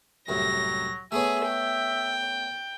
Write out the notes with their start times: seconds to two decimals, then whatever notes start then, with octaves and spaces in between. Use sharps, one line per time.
0.28 C2 F#2 A2 F#3 A#6
1.12 A3 B3 G#4 C#5 E5
1.46 G5